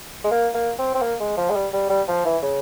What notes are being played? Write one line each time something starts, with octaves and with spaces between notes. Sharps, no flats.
G#3
A#3
A#3
C4
C4
A#3
G#3
F3
G#3
G3
G3
G3
F3
E3
C#3